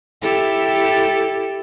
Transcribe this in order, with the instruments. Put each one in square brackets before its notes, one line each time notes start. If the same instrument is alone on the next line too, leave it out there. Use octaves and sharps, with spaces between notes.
[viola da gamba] E4 G4 A4